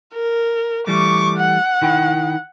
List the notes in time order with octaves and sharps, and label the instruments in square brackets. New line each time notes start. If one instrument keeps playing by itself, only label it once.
[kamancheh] A#4
[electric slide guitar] E3 G3 A3 [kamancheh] C#6 D6
[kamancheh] F#5
[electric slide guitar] D#3 E4 G5